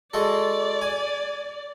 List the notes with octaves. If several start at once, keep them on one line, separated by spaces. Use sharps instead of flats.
G#3 F#4 A4 D5
G#5